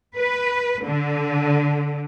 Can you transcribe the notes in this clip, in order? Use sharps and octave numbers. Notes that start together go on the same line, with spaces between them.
B4
D3